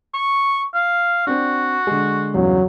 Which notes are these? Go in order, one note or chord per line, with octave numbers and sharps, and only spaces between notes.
C#6
F5
C4 D4 F#4
D3 G#3
E2 G2 C#3 F#3